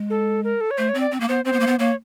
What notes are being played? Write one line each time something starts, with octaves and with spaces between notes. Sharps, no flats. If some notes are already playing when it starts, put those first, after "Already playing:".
Already playing: G#3
A4
A#4
A4
C#5
A3 C5
C#5
C4
D5
C4
A#3
B3 C5
C4 C5
B3
A#3
B3
A#3 C#5